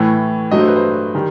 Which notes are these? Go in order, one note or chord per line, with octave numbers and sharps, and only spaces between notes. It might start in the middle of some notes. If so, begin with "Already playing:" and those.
Already playing: A2 E3 A3
G2 F#3 A3 D#5
C5
B4
C5
D#3 G3